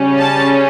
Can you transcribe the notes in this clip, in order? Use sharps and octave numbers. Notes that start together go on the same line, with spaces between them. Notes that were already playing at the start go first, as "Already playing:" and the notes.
Already playing: C#3 G3 C#4
A5